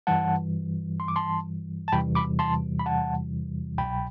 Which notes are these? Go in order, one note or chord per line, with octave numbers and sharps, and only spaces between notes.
G2 E3 G3 F#5 A5
C6
D6
A5 C6
A5
E2 C3 E3 G3 G5 B5
B5 D6
A5 C6
B5
F#5 A5
C2 B2 F#3 G5 B5